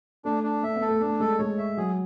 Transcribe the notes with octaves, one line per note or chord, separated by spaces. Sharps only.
A3 D4
D4
A3 E5
B3
A4
A3
A3 D4
G#3 A4
G#3 C#5
E5
F#3 G#4